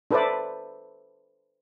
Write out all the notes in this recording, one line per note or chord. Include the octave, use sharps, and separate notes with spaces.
D4 A4 B4 C5 D5 E5